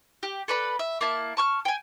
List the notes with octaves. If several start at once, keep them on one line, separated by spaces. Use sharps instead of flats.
G4
A4 B4 D5 B5
E5
A#3 E4 A5
A5 C#6 F6
G5 G#5